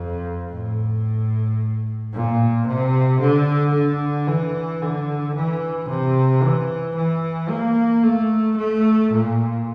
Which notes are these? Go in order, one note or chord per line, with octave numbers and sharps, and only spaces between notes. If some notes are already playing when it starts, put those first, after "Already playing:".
Already playing: F2
A2
A#2
C3
D3
D3
E3
D3
E3
C3
E3
E3
A#3
A3
A3
A#2